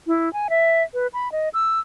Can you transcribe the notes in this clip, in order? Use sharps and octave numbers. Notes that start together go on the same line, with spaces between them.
E4
G#5
E5
B4
B5
D#5
E6